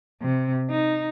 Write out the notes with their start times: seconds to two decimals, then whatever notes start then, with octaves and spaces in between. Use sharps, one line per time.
0.22 C3
0.70 D#4